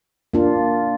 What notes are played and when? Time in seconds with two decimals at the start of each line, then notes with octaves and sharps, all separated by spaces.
0.34 A#3 D4 F4